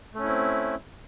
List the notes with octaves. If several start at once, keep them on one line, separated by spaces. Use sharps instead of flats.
A3 C4 C#4 E4